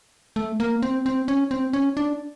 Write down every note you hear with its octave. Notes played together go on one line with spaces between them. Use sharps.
A3
A#3
C4
C4
C#4
C4
C#4
D4